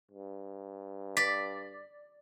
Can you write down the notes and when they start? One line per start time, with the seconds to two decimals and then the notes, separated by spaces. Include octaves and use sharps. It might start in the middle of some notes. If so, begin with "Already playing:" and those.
0.11 G2
1.17 D5 B6